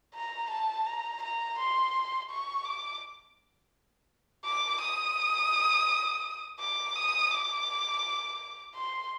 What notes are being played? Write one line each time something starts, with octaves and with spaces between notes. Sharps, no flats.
A#5
A5
A#5
A#5
C6
C#6
D6
D6
D#6
D6
D#6
D6
C6